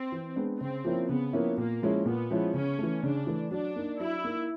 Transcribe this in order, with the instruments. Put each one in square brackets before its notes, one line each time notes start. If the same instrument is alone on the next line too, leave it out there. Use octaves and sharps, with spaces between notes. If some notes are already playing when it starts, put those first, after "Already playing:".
Already playing: [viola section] C4
[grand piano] E3
G#3 B3 D4
[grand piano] C#3 [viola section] C4
[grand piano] F3 A#3 C#4 E4
[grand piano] C#3 [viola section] B3
[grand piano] F3 A#3 C#4 E4
[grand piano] A#2 [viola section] A#3
[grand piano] F3 G#3 C#4 E4
[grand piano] A#2 [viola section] B3
[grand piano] F3 G#3 C#4 E4
[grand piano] C#3 [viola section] C#4
[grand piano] E3 A3
[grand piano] C#3 [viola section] D4
[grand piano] E3 A3
[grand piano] F#3 [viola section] D4
[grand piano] A#3 D#4
[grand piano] F#3 [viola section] E4
[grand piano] A#3 D#4